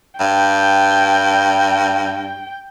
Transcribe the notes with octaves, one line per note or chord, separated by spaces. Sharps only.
G2 G5